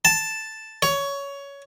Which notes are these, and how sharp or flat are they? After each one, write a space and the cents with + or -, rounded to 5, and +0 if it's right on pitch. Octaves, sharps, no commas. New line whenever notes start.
A5 +0
C#5 +15